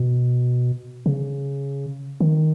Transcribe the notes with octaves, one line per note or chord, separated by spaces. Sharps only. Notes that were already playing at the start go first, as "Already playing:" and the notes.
Already playing: B2
C#3
D#3